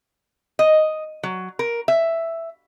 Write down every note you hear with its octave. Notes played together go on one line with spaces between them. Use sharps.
D#5
F#3
A#4
E5